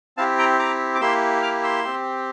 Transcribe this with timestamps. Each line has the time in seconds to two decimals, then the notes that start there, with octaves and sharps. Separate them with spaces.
0.17 C4 E4 G4 F5 A5
0.38 G5 A#5
0.59 A#5 D6
0.95 D6
1.01 A#3 E4 G4 C6 E6
1.42 D6 F6
1.63 C6 E6
1.84 C4 G4